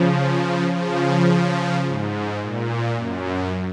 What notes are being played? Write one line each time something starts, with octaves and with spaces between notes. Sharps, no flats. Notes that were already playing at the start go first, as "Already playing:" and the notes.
Already playing: C#3 F3
C#3 F3
G#2
A#2
F#2